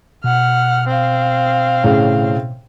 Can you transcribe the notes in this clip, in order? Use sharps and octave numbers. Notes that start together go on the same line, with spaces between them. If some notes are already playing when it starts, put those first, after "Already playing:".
B2 F#5 F6
C4 F5
A2 C#3